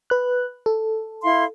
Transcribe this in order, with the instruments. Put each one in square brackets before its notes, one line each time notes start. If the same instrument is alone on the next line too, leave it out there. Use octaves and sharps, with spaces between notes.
[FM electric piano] B4 F#6
A4
[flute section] E4 F5 C6